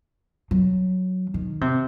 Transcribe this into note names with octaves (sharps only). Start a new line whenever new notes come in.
F#3
D#3
C3